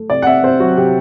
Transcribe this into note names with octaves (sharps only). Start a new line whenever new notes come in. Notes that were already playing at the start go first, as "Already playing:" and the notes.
Already playing: A3
C3 D5
F#5
C4 E5
C3 C5
F#3 F#4
C3 G4